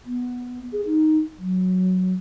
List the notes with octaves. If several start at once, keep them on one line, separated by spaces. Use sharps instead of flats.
B3
G#4
D#4
F#3